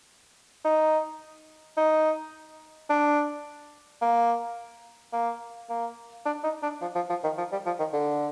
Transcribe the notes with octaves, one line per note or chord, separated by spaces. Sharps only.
D#4
D#4
D4
A#3
A#3
A#3
D4
D#4
D4
F3
F3
F3
D#3
F3
G3
F3
D#3
D3